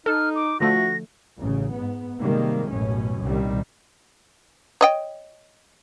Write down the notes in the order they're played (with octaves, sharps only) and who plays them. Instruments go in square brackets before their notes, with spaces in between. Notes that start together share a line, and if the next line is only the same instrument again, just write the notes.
[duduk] D#4 [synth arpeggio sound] A4 [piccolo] F6
[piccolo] D6
[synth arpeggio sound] D3 F3 A3 [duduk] F#4 [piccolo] A#6
[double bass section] A1 C#3
G#2 B3
C3 D#3 G3 G#3 A#3
A1 F#2 B2 C#4
C2 A#2 D#3 G3
[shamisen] C#5 D#5 G5